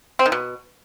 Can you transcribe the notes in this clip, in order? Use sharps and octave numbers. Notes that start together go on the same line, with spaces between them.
C4
D#3
B2